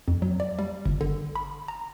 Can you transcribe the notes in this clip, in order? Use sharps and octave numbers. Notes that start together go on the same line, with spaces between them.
F2
F#3
D5
G3
G1
D3
B5
A#5